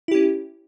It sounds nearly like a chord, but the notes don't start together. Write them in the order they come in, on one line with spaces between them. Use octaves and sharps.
E4 G4 C#4